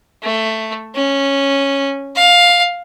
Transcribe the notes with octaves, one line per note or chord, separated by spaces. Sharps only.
A3
C#4
F5